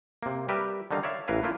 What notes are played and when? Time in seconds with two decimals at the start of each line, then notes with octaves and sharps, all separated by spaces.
0.23 C3 A#3
0.48 G3 G4 A#4 B4 E5
0.91 D3 D#3 G3 D#4 F5
1.03 C#5 D5 E5 F5
1.28 A1 E3 A#4 B4 F5 G#5
1.43 A3 A#3 E4 F4